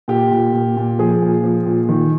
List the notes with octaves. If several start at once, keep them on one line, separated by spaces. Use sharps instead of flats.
A#2 G4
A#2
A#2
A#2
F3 G#4
A#2
F3
A#2
D#3